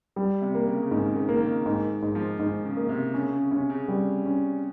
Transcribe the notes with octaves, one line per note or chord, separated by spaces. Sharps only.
G3
C3
A#3
C#3
C#3
G#2 D#3
C#3
D#3
A#3
D#3
C#3
G#2 D#3
G#2
F3
G#2 D#3
C#3
A#3
C3
C#3 C#4
C#3
C3 C#4
C#3
G3
C#4